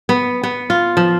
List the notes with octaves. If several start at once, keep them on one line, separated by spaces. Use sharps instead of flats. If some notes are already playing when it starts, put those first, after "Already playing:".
B3
B3
F4
F3